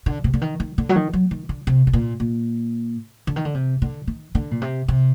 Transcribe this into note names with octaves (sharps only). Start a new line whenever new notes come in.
D3
C3
D3
D#3
D#3
D3
F#3
D#3
F#3
D#3
D3
C3
C3
A#2
A#2
D3
D#3
D3
C3
D3
D#3
D3
A#2
C3
C3